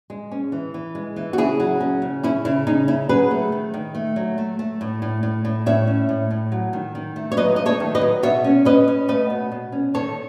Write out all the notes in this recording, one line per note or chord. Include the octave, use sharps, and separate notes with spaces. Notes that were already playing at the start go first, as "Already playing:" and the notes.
G#3
C#4
E3
E3
G#3
E3
F#4
C#3 E4 G#4
F#3
C#4
C#3
C#4 E4
C#3 E4
C#3 D#4
C#4 E4
F#3 G#4 B4
A3
D#3
D#3
A3
F#3
A3
A3
A2
A2
A2
A2
A2 C#5 E5
C#4
A2
A2
F#3
D#3
D#3
A3
C#5
F#3 B4 D#5
A3 D#5
A4 C#5
D#3
B4 D#5
F#3
B2 C#5 E5
C#4
C#4 B4 D#5
C#4
A3 B4 D#5
B2
B2
C#4
D#3 A4 C#5